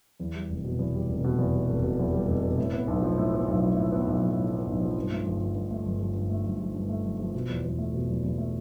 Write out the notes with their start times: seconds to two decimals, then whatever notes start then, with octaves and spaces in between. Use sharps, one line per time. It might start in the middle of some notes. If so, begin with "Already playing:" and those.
0.20 E2
0.35 G3
0.50 F1
0.64 B2
0.79 E2
0.95 G3
1.09 F1
1.24 B2
1.38 E2
1.54 G3
1.69 F1
1.84 B2
1.99 E2
2.13 G3
2.28 F1
2.43 B2
2.58 A2
2.73 B3
2.88 B1
3.02 F3
3.18 A2
3.33 B3
3.48 B1
3.62 F3
3.76 A2
3.92 B3
4.07 B1
4.22 F3
4.36 A2
4.52 B3
4.67 B1
4.81 F3
4.96 G2
5.11 A3
5.26 G1
5.41 F3
5.55 G2
5.71 A3
5.85 G1
6.00 F3
6.15 G2
6.30 A3
6.46 G1
6.60 F3
6.74 G2
6.89 A3
7.05 G1
7.20 F3
7.34 B2
7.49 E2
7.65 E2
7.79 A3
7.94 B2
8.09 E2
8.24 E2
8.38 A3